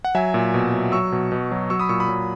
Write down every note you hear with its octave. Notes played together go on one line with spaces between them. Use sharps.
F#5
F#3 E5 G#5
A#2
B2
F#3
F#3 C#6 E6
B2
B2
F#3
F#3 C#6 E6
B5 D#6
A#2 C#6 E6
B5 D#6
F#3